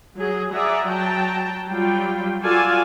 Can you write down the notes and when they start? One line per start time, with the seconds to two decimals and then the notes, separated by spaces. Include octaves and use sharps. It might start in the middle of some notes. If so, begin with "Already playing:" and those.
0.16 F#3 G#4
0.52 G#4 D5 E5 F#5 A#5
0.89 F#3 F#4 G5 A5 A#5
1.69 F#3 G3 F4 G5
2.42 F4 F#4 A4 D5 F5 G#5